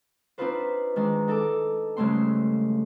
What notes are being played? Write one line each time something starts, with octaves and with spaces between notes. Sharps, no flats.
C4 D4 D#4 F4 B4 C5
D#3 G#3 D4
D#4 A4 A5 D6
G2 C#3 G#3 A3 C4 C6